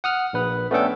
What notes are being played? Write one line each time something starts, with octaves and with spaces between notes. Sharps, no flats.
F#5 D#6 F6
A#1 B4
A3 B3 C#4 D4 A4 G5